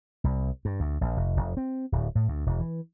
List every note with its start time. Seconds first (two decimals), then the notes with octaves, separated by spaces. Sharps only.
0.24 C2
0.65 G2
0.80 D2
1.01 A#1
1.17 F1
1.36 F1
1.57 C4
1.92 D1
2.15 A2
2.28 D2
2.46 E1
2.60 E3